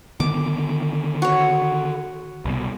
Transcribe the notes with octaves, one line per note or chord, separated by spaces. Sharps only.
D3 D#3 B3 D6
F#4 C#5
C2 B2